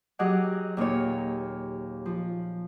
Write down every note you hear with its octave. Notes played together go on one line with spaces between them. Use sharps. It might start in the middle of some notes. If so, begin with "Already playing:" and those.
F#3 G4 G#4 D#5 F#5 D6
D#2 A#2 D#4 C#5
F3